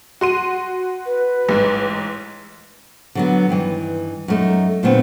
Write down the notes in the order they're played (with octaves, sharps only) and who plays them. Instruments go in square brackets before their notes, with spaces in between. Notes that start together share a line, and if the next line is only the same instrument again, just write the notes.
[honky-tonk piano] F#4 C6 D#7
[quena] B4
[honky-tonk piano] A1 G#2
[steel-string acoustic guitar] D3 F#3 B3
G2 D#3 E3
F#2 A3 D#4
A#2 D3 A3 B3 C4